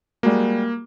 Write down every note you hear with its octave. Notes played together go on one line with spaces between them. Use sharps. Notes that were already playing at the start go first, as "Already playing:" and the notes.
G3 G#3 A#3 F#4